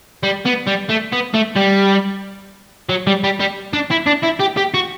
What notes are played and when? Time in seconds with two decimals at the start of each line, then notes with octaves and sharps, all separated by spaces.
0.23 G3
0.45 B3
0.67 G3
0.89 A3
1.12 B3
1.34 A3
1.56 G3
2.89 F#3
3.07 G3
3.24 G3
3.40 G3
3.73 D4
3.91 E4
4.07 D4
4.23 E4
4.40 G4
4.57 G4
4.74 F#4